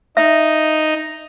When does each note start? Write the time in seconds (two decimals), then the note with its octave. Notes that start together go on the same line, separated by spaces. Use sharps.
0.17 D#4 E5